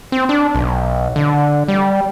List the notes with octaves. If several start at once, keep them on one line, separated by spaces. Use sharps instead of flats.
C4
D4
B1
D3
G3